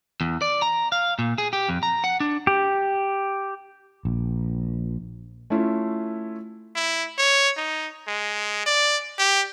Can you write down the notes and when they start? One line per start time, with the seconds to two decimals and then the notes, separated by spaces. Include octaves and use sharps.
0.21 E2
0.42 D5
0.62 A#5
0.92 F5
1.19 A#2
1.38 G#4
1.53 G4
1.69 F2
1.83 A#5
2.04 F#5
2.20 D4
2.47 G4
4.05 A#1
5.50 A3 C#4 E4 F4
6.76 E4
7.18 C#5
7.57 D#4
8.08 G#3
8.66 D5
9.19 G4